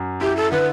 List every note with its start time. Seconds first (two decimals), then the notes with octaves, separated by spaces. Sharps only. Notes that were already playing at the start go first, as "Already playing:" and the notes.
Already playing: F#2
0.21 E4 G4
0.37 A4
0.52 D3 B4